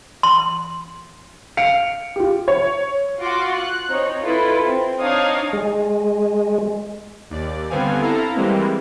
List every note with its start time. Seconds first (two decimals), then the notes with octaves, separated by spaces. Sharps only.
0.23 C6
1.57 F5 C#7 D7
2.16 F4 G4
2.48 C#5
3.20 F4 F#4 F#5 C6 D6
3.54 F#6
3.89 C4 D#4 C#5
4.22 E4 F4 A4 B4
4.66 C4
4.99 D4 D#4 C#5 F5 D#6
5.53 G#3
7.30 D#2 D5
7.70 G2 D3 B3 C4 F5 G#5
8.01 E4 A4 F5 A#5
8.35 E3 G3 G#3 A#3 C4